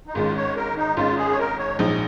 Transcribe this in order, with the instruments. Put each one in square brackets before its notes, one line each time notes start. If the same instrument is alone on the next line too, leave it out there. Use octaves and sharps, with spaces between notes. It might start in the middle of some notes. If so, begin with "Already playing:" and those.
[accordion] D#4
[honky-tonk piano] G#1 G#2 D#3 G#3 C#4 [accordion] F4
[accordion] C#5
A#4
D#4
[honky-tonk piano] G#1 G#2 D#3 G#3 C#4 [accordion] F4
[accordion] G#4
C#5
A#4
C#5
[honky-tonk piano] A#1 G#2 F3 G#3 D#4